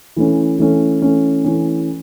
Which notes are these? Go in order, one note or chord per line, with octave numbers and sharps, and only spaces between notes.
E3 A3 C#4
E3 A3 C#4
E3 A3 C#4
E3 A3 C#4